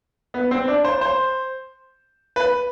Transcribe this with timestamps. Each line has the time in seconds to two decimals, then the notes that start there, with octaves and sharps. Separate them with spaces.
0.34 B3
0.51 C4
0.68 D4
0.85 C5
1.01 C5
2.36 B4